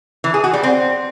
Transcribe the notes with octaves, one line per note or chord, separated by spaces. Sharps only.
E3
G#4
F#4
G3
C4